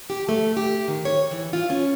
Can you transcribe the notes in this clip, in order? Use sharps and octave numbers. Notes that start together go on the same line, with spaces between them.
G4
A3
G4
D#3
C#5
E3
F4
C#4